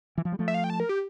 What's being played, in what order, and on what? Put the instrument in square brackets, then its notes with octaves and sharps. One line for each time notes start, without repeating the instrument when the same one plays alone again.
[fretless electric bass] E3
F3
G3
F3 A3
[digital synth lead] E5
F5
G5
A5
A#4
G4